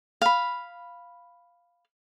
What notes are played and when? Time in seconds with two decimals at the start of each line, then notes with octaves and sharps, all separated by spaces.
0.22 F5 B5